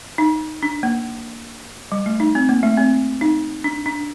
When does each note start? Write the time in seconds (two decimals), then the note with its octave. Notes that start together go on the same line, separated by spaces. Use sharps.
0.18 D#4
0.63 D4
0.83 A#3
1.92 G3
2.06 A3
2.20 D#4
2.35 C4
2.49 A#3
2.63 A3
2.77 C4
3.21 D#4
3.64 D4
3.86 D4